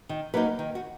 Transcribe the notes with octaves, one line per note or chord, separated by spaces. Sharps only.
D#3
F#3 A#3 D#4 B4
D#3
F#4